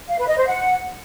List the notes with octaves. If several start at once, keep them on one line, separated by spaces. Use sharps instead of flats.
F5
B4
D#5
C5
F#5